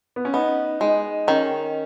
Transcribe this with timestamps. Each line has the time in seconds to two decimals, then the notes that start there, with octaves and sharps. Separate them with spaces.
0.16 B3
0.25 C#4
0.34 B3 D#4
0.80 G#3 D#4
1.28 D#3 C#4